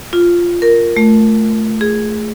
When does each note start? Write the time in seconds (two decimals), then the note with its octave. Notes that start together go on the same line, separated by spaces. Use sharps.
0.13 F4
0.62 A#4
0.96 A3
1.81 G#4